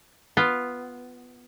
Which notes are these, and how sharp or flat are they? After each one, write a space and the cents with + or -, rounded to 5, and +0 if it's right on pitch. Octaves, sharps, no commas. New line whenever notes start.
B3 +0 F4 +0